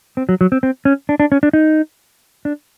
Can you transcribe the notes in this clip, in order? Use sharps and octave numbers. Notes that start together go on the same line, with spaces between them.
C4
F#3
F#3
C4
C4
C#4
D4
D4
C#4
D4
D#4
D4